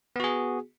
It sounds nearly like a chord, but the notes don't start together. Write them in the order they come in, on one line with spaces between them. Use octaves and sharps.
B3 F#4 G#4